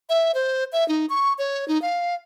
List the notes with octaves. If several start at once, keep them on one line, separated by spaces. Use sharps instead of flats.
E5
C5
E5
D#4
C#6
C#5
D#4
F5